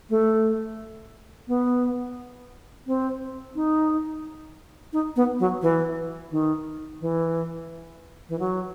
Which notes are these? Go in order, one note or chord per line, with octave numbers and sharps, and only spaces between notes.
A3
B3
C4
D#4
D#4
B3
F#3
E3
D#3
E3
E3
F#3